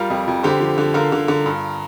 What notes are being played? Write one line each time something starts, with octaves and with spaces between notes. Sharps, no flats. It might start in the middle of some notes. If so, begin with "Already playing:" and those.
Already playing: G3 F4 A#4
F2
F2
D3 G4 C5
F3
D3
D3 F4 A#4
D3
D3
G2